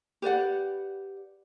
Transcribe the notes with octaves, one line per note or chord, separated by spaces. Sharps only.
G4 B4 D5 F#5